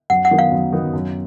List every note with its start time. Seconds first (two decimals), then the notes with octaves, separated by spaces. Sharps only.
0.10 F#2 F#5
0.25 F#5
0.31 D#3 F#3 B3 D#4
0.39 F5
0.51 F#2
0.72 D#3 F#3 B3 D#4
0.93 F#2